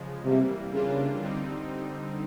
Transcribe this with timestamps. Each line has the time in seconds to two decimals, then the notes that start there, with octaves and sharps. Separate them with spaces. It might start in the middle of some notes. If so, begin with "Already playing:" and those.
Already playing: C#3 F3 G#3
0.24 C3 E3 G3 A#3
0.73 C#3 E3 G3 A#3 D4 F4
1.21 D3 G3 C4 D#4